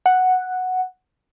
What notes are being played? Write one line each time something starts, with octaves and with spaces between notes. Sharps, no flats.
F#5